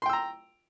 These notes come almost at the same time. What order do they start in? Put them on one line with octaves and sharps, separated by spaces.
C6 G5 E6 A#5